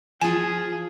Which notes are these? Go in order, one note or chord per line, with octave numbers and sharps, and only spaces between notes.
F3 F4 G#4 G#5